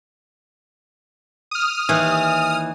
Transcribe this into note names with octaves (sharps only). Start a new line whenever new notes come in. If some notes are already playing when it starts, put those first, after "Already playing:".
D#6 F6
D#2 E3